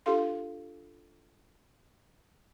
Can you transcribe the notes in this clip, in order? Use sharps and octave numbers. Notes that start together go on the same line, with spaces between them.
D4 F4 G4 A4 F5 C6